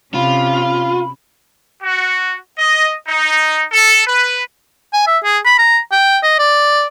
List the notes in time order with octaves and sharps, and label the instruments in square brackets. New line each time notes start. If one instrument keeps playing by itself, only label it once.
[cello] C3 C#4 [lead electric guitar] F4 [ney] B5
[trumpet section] F#4
D#5
D#4
A4
B4
[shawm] G#5
E5
G#4
B5
A#5
G5
D#5
D5